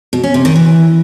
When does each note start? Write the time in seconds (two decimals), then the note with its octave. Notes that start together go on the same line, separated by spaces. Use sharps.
0.13 B2
0.23 C#4
0.34 C3
0.45 D#3
0.56 E3